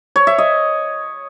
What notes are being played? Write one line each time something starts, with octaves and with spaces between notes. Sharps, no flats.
C#5
E5
D#5